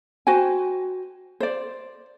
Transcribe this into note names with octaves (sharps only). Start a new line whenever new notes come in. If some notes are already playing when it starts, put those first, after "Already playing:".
F#4 C5 G5 G#5
C5 D5